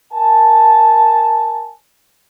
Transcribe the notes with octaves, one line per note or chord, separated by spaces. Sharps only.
A#4 G#5 A5